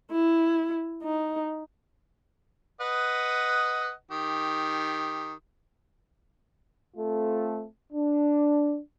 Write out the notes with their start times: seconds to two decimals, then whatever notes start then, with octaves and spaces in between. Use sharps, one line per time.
0.11 E4
1.03 D#4
2.81 B4 D#5 F#5
4.11 D#3 G4
6.96 A3 C4 F4 A4
7.93 D4